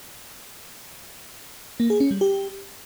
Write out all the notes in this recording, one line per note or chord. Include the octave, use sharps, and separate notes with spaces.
A#3
G#4
C#4
G3
G4